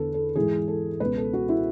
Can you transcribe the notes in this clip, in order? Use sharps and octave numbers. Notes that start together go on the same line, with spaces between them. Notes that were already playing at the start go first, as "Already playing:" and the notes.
Already playing: E2 D3 A4 B4
A4
G#2 E3 G#4
A4
C#2 B2 B4
A4
F#4
E4